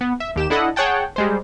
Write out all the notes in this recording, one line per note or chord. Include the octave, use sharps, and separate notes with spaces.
B3
E5
D#2 G4 E7
D4 E4 A4 D#5 F#5
G#4 C#5 F#5 G5 A5
G3 G#3 C5